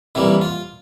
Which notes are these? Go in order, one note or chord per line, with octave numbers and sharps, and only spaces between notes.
F2 E3 G3 A#3 E4
F4